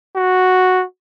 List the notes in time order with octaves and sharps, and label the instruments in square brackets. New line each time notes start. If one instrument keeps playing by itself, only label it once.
[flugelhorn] F#4